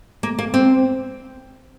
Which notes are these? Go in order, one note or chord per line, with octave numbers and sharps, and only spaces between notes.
A#3
A#3
C4